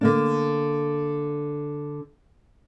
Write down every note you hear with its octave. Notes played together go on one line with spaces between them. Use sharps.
D3 A#3 D4